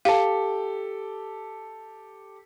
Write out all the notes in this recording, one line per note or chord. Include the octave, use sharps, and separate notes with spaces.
G4 A4 F5